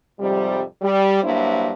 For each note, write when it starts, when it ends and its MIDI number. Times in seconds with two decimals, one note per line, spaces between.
0.19 0.62 41
0.19 0.62 44
0.19 0.62 48
0.19 0.62 55
0.82 1.19 55
1.22 1.73 43
1.22 1.73 54
1.22 1.73 58
1.22 1.73 62
1.22 1.73 64
1.22 1.73 72